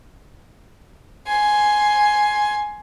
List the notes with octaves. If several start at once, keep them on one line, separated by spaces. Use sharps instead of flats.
G#5 C6